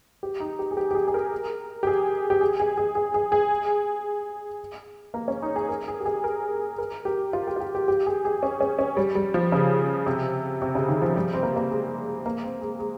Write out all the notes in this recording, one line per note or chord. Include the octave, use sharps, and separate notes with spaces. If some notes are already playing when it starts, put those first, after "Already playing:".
G4
D#4
G4
G#4
G4
G4
G#4
G#4
A#4
G4
G#4
G4
G#4
G#4
G#4
G#4
G#4
G#4
A#3
C#4
D#4
G#4
A#4
G#4
G4
G#4
A#4
A#4
G4
F4
G4
F4
G4
G4
G4
G#4
G#4
C#4
C#4
C#4
G3
G3
F3
C#3
C3
C3
C#3
D#3
F3
G3
C4
A#3
A#3
G#3
A#3
C4
G#3
G#3